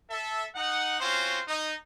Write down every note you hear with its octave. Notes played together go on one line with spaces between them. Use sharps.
A4 E5
D#4 F#5
C4 C#4 F4 F#4 C5
D#4